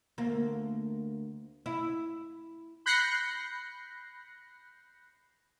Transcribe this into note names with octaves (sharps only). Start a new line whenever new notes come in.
D2 A#3
E4
B5 F#6 G6 A#6 C7 C#7